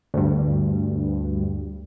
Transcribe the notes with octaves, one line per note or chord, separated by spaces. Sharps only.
D2 G2